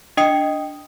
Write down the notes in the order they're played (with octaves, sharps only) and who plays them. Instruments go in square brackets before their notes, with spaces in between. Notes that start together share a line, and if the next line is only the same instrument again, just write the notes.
[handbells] D4 D#5 G5 D#6 C#7